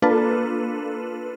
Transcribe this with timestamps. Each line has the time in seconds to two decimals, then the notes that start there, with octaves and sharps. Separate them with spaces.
0.02 A#3 D4 F4 A4 B4